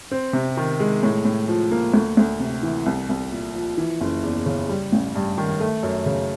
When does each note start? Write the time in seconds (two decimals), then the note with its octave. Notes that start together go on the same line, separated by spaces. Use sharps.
0.11 C4
0.33 C3
0.57 D#3
0.80 G#3
1.03 A2
1.25 A2
1.48 F3
1.71 A#3
1.94 D2
2.17 D2
2.40 C3
2.63 E3
2.86 C2
3.09 C2
3.31 A#2
3.55 F3
3.77 E3
4.01 F#1
4.23 E2
4.46 C#3
4.69 G3
4.92 A1
5.15 G2
5.38 D#3
5.60 A3
5.83 F#2
6.06 C#3